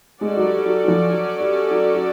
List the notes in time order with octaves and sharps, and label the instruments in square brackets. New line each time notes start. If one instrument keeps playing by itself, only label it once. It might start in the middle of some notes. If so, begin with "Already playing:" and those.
[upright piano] G#3 [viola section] C#4 F#4 A4 D5
[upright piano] F#3
G3
G3
F#3
F#3
F3
F#3
G3
F#3
F#3